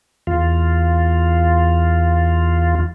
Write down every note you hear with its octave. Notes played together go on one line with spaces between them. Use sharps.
E2 F4